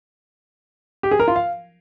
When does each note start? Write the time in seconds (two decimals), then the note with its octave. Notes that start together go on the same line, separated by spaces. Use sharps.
1.03 G4
1.11 G#4
1.20 A#4
1.28 F4
1.36 F5